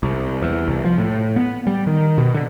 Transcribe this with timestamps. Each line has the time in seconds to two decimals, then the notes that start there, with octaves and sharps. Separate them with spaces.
0.03 C2
0.42 E2
0.67 C2
0.85 F3
0.98 A2
1.36 B3
1.67 G3
1.87 D#3
2.18 B2
2.34 D3